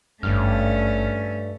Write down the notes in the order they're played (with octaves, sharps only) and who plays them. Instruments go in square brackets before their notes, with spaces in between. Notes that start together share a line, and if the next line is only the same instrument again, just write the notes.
[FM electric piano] G#1 F6 [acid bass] G2 [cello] A3 C#4